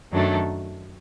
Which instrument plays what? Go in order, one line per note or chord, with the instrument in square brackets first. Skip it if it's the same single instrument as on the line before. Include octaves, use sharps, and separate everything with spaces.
[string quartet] F#2 D#3 F#3 A3 D4